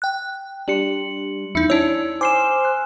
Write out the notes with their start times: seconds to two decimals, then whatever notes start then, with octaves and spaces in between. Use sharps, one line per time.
0.02 G5 F#6
0.68 G3 D4 C6 C#7 F#7
1.55 E2 D#4 E4 E5 C#7
1.70 C#4 D4 E4 C#5 E6
2.21 C5 G#5 C6 D6 F6 E7
2.65 F#6